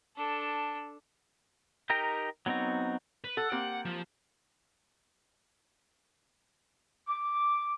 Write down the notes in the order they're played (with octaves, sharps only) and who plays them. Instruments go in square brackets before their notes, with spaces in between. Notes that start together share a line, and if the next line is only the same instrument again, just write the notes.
[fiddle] D4 A4
[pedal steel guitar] D#4 G4 A#4 G5 A#5
F#3 B3 C4 D#4 F#4
[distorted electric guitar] B4
[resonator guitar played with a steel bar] A4 [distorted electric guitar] F#5
[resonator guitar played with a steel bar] A#3 C4 G4
[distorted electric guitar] F3
[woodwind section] D6